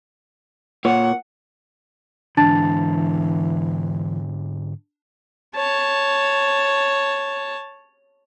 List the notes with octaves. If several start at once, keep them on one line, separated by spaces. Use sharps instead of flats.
A#2 C#5 F#5
G#2 D3 E3 D4 A5 A6
C#5 A5